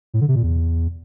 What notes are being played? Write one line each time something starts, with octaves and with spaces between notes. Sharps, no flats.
A2
D3
C3
A#2
E2